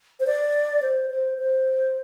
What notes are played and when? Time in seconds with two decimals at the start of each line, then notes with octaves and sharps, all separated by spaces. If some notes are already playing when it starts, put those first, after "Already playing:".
0.20 C5
0.27 D5
0.82 C5
1.10 C5
1.38 C5